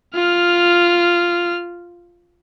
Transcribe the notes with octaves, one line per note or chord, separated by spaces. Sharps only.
F4 F6